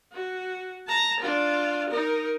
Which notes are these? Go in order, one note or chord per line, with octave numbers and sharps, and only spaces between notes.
F#4
A5 A#5
D4 F4
D#4 A#4